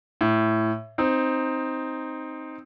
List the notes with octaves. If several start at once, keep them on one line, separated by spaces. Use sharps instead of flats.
A2
C4 D#4